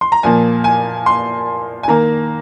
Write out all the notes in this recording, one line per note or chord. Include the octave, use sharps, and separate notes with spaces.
C6
A#5
A#2 F3 A#3 G#5
G#5
C6
G#5
D#3 A#3 A#5